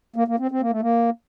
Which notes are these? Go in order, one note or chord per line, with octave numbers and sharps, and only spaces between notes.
A#3
A#3
C4
C4
A#3
A3
A#3